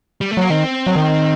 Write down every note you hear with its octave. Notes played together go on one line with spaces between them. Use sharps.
G3
A3
F#3 A#3
D#3 C4
F#3
D#3